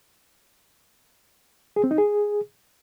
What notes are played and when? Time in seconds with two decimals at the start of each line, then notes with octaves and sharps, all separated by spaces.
1.76 G#4
1.84 C4
1.91 D#4
1.98 G#4